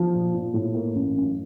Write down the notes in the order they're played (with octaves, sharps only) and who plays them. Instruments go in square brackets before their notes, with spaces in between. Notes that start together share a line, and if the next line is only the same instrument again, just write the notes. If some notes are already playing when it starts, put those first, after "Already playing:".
Already playing: [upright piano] F3
A#2
A#2
A2
A#3
A1
F#2